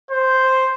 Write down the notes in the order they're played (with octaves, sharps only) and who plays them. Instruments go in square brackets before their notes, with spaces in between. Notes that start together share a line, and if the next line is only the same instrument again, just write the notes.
[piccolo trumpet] C5